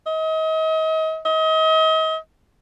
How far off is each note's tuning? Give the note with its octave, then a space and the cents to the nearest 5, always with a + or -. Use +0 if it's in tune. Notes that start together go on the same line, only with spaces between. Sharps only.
D#5 +35
D#5 +35